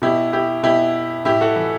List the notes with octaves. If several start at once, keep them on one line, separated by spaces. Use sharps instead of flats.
B2 E4 G4
E4 G4
B2 E4 G4
A2 E4 G4
F#4 A4
E3